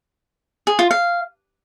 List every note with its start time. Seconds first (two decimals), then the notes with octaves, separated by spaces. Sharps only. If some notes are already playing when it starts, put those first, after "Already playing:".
0.67 G#4
0.79 F4
0.91 F5